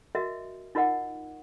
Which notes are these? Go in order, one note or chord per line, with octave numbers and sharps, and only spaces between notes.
F#4 A#4 D#5 E5
D#4 F4 A#4 D#5 F#5